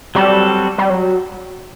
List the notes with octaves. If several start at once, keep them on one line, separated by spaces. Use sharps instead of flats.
F#3 G3 C4 F#4 A4
G3
F#3